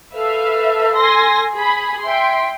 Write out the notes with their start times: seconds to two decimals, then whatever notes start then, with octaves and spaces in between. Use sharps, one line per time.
0.14 A4 B4 E5 F5
0.96 G#5 C6 A#6
1.56 G#4 B5
2.05 E5 G5 C6